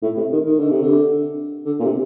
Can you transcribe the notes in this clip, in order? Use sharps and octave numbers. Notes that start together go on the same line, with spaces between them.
A2
C3
D#3
D#3
D3
C3
D3
D3
A#2
C3